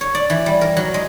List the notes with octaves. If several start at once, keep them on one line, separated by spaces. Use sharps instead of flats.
C#5
D5
E3
G3
A#4
F#3
G#3